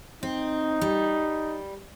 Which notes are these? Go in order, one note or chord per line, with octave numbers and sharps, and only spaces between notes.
C4 D#4
G3